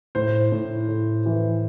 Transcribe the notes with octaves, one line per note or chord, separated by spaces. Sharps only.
A2 C5
A2
A2
E3